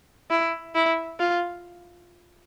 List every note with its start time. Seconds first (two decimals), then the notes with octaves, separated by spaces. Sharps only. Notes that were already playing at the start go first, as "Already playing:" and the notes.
0.31 E4
0.75 E4
1.20 F4